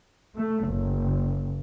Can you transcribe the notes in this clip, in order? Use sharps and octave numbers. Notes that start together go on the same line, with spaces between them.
A3
F#1